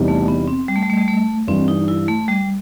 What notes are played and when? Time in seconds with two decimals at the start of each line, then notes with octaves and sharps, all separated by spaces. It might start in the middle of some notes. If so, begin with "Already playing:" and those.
Already playing: E2 C3 E3 G3 D#4
0.08 A3
0.28 B3
0.48 C4
0.68 G3
0.76 A3
0.82 G3
0.90 A3
0.98 G3
1.08 A3
1.47 G2 E3 G3 C4
1.68 D#4
1.88 E4
2.08 A3
2.28 G3